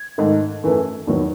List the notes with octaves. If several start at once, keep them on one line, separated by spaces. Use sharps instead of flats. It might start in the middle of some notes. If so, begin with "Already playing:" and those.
Already playing: G#6
G#2 D#3 A3
F#2 E3 A3
E2 D#3 F#3